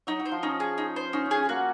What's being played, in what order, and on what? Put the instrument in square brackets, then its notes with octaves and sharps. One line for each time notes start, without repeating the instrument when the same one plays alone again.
[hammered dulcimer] F#3 [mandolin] D#4
[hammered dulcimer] F#3
[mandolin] C5
[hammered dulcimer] F3
[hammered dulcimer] C#4 [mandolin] D#4
[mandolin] G#4
D#4
C5
[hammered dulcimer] C#4 [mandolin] D#4
[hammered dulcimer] C#4
[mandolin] G#4
[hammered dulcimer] C#4
[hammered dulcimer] A#3 [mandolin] F#4